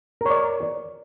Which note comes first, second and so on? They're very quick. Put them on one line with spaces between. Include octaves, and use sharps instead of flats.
A#4 C#5 D5